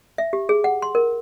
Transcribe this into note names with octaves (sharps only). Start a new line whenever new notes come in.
E5
G4
G#4
F#5
C6
A#4